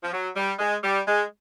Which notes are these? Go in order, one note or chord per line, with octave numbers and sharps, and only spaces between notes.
F3
F#3
G3
G#3
G3
G#3